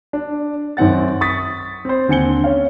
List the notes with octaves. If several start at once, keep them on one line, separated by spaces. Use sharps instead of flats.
D4
F#2 D#3 C4 F#5 A6
C#6 D#6 A6 B6
C4 C5
D#2 D3 C4 G#5 C#7 G7
C#4 C#5 F5